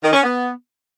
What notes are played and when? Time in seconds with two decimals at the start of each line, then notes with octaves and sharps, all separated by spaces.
0.03 D#3
0.13 C#4
0.24 B3